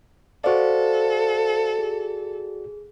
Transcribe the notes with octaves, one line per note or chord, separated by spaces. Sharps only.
F#4 A4 C5 D5 F5
G#4